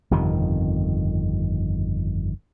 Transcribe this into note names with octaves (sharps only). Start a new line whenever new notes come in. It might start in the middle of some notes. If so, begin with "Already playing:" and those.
G1 F2 C3 D#3